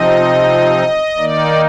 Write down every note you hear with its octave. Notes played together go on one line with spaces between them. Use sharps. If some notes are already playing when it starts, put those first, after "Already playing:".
Already playing: C3 F3 C4 D#4 D#5
D#3 A#3 D#4 D5